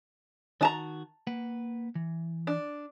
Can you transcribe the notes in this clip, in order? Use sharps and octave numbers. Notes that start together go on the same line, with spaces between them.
D#3 D4 F#4 A5 A#5
A#3 B4 F#5
E3
D4